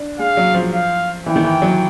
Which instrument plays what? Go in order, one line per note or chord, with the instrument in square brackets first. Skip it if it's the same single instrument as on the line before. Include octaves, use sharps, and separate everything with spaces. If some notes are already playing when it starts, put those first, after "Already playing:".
Already playing: [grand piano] D4
[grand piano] G#3 [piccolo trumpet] F5
[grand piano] F#3
F3
[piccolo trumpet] F5
[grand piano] E3 [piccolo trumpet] G5
[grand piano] D#3
E3
F#3